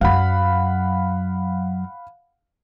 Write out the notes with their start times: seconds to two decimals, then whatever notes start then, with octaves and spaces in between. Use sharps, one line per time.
0.01 F#2 F#3 F5 F#5 B5